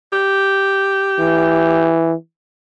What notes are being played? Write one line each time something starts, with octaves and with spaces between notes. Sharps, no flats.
G4
E3